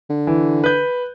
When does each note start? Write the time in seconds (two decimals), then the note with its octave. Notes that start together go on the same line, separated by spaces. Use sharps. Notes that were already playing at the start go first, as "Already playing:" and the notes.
0.10 D3
0.27 E3
0.64 B4 G6